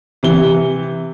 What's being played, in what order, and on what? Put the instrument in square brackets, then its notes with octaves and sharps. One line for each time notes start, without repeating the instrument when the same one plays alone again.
[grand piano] C3 E3 G7